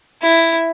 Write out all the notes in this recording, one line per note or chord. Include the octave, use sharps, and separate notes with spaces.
E4